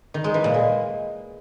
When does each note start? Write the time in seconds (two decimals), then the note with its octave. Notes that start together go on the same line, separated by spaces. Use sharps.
0.14 D#3
0.24 G#3
0.34 E3
0.44 A#2
0.54 G#3